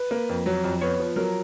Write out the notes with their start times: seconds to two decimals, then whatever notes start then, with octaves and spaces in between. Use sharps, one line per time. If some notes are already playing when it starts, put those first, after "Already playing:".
Already playing: B4
0.11 A#3
0.29 F2
0.46 F#3
0.64 F2
0.81 B3 C#5
1.00 F3
1.16 F#3 A#4